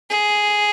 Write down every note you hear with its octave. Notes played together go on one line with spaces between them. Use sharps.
G#4